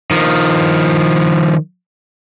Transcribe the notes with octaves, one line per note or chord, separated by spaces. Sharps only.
D#3 F3